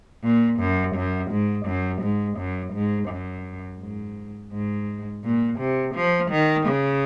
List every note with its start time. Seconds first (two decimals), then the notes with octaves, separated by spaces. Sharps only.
0.23 A#2
0.59 F#2
0.95 F#2
1.31 G#2
1.66 F#2
2.02 G#2
2.38 F#2
2.73 G#2
3.09 F#2
3.80 G#2
4.52 G#2
5.24 A#2
5.59 C3
5.95 F3
6.31 D#3
6.67 C#3